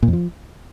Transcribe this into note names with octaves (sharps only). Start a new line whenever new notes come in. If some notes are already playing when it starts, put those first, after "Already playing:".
A#2
F2
F3